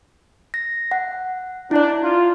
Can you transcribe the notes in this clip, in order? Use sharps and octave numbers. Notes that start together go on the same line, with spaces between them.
A#6
F#5
D4 E4 D5
F4